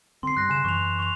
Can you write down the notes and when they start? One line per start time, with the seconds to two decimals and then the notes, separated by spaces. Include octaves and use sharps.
0.23 D3 C4 C6 C7
0.37 G2 F#6 A#6
0.50 C#3 G#5 E7
0.64 F#2 E3 C#6 F7
0.99 C#6 F7